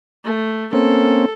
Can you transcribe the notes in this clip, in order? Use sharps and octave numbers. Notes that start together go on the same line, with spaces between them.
A3
A#3 C4 C#4 A4